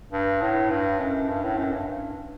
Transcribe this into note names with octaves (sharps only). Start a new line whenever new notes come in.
G2
A2
G2
F#2
G2
A2
F#2
G2
G2